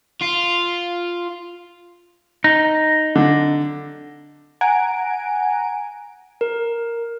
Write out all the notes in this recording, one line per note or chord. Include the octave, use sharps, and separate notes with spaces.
F4
D#4
D3
F#5 G#5 A#5 D7
A#4